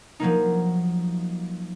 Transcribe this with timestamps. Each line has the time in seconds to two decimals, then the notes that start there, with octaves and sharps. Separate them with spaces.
0.20 F3 F#3 A#3 D#4